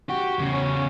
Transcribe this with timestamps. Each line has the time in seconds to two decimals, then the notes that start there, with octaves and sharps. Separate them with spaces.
0.09 F#4 G4
0.39 E2 C#3
0.53 C#4